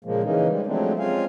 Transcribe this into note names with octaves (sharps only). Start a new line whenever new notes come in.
A#2 C#3 F3 G#3 A#3
C#3 E3 A#3 C#4 D#4
G3 G#3
F3 F#3 G#3 A3 C4 D4
G#3 C4 C#4 F4 F5 G#5